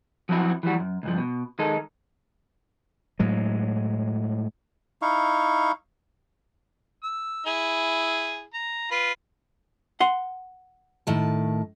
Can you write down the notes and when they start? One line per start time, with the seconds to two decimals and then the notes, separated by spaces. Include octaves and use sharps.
0.29 F3 F#3 C4 E4 F#4
0.63 E3 F3 G3 F#4
0.80 F#2
1.03 C#2 G2 F3
1.18 B2
1.59 D#3 G#3 D#4 A4
3.19 A2 F#3 G#3
5.02 D#4 E4 F5 C#6
7.03 E6
7.46 E4 G#4
8.54 A#5
8.91 F4 B4
10.00 F#5 C6
11.07 A2 D#3 A5